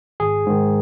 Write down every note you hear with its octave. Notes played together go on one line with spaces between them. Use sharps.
G#1 G#4
G#2 D#3